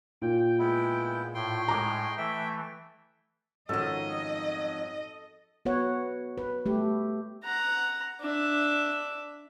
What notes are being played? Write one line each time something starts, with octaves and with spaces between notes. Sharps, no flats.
A#2 G5
G#3 B3 E4
A2 G5 C6
A2 G#3 A#5 D6
E3 A3 E5 G5
F2 G#2 D#3 C#4 F#4 A4 D#5
B3 F#4 B4 C#5 F#5
B4
A3 G4
F#5 A#5
D4 E5